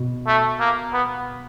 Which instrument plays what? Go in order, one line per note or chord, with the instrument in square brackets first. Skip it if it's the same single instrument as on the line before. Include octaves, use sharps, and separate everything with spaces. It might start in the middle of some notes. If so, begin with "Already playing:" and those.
Already playing: [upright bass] B2
[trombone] A3
A#3
B3